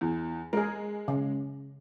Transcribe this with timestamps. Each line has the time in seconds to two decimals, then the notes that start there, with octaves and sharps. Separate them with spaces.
0.01 E2
0.53 G#3 G#4 A#4
1.08 C#3